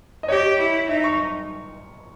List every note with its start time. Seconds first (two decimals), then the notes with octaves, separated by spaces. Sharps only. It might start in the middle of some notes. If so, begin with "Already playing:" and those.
0.23 D#5
0.28 G4 C#5
0.58 E4
0.88 D#4 E5
1.04 C#6